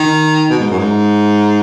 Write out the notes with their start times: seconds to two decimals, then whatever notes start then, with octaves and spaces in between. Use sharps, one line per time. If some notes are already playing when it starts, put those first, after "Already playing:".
Already playing: D#3
0.50 B2
0.59 G#2
0.70 F#2
0.79 G#2